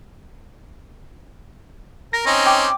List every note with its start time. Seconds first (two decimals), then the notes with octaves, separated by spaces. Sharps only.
2.13 A#4 A#6
2.26 C4 C#4 D#4
2.46 G5 D6